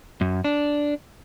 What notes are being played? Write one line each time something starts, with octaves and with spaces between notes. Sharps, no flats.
F#2
D4